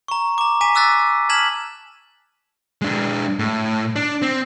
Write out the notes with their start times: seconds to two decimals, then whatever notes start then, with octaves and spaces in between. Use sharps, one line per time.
0.08 A#5 C#6
0.38 A#5 D6
0.61 G#5 A#5 D6 B6 D#7
0.75 D6 E6 F#6 A6 B6
1.29 A5 F6 G#6 B6 E7 F#7
2.82 G#3 D4
3.39 A2
3.96 D4
4.22 C4